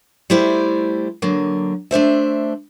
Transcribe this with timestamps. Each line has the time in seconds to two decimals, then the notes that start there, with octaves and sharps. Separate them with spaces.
0.30 G3 A3 E4 C5 D5
1.22 D3 F#3 A#3
1.91 A3 D4 C5 E5